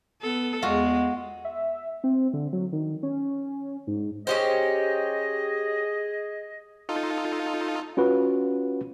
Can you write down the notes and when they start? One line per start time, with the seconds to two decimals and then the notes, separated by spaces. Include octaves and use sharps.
0.22 B3 A4
0.62 E2 G#3 F4 F#4
1.45 E5
2.04 C4
2.33 D3
2.53 F#3
2.72 D#3
3.03 C#4
3.87 G#2
4.27 C#4 G4 G#4 C5 D#5
6.89 D#4 F4 A4
7.97 C#4 F4 F#4 B4